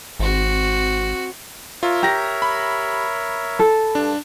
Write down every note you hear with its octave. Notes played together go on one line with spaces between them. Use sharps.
G#1 C4 F#4
F4 A#4 C#5 E5
G4 A#5 A#6
B5
A4
G2 D4